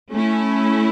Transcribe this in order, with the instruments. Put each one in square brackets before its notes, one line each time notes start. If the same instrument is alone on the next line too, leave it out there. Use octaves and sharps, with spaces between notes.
[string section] A3 C#4 E4